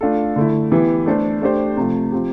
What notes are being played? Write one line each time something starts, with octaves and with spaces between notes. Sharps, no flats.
A3 D4 F4 A4
D3 A3 E4
E3 B3 E4 G4 B4
A3 D4 A4 C5
A3 D4 G4 C5
C3 F3 A3
F3 C4 G4